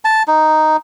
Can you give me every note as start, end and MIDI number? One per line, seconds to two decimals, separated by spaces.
0.05 0.23 81
0.28 0.77 63